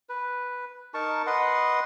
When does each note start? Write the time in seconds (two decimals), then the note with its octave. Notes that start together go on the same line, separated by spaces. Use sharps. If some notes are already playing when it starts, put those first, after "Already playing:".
0.09 B4
0.94 D#4 A#4 A5 C#6
1.27 B4 D#5 F#5 C6